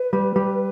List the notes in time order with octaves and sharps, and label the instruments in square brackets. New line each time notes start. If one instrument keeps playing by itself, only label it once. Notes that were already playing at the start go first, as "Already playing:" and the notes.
Already playing: [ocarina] B4
[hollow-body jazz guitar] G3
G3